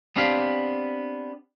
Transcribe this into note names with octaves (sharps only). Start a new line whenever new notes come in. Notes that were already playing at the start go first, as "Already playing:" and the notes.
B3 C4 D4 G4 F5